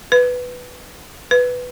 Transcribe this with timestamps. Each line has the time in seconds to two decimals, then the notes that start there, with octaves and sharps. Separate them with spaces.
0.12 B4
1.31 B4